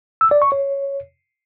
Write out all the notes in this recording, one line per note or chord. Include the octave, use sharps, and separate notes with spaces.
E6
D5
C#6
C#5